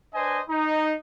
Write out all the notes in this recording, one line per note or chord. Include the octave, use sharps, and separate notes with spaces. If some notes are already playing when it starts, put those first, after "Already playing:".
D4 B4 C5 D#5 G#5
D#4